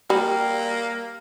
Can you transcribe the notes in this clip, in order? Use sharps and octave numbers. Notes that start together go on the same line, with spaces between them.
G3 A#3